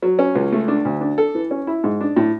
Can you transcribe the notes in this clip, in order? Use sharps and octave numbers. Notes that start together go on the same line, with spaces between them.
F#3
C#4
C#2
A3
D4
D2
D4
A4
E3
C#4
E4
G#2
D4
A2